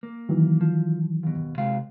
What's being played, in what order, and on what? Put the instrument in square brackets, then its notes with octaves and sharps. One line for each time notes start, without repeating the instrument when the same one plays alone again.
[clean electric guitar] A#3
[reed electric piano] D#3 E3 F#3
[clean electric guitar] F3
D#2 B2
C3 G#3 F5